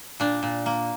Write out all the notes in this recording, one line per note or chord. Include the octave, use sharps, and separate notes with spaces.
A#2 D4
A#2
A#3